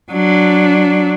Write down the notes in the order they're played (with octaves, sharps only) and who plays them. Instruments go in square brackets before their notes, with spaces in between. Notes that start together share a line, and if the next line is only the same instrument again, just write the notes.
[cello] F#3 D4